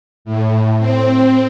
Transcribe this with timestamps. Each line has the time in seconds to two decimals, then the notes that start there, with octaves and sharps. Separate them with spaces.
0.25 A2
0.78 C4